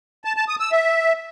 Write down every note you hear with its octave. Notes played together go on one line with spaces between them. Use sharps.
A5
A5
D#6
E6
E5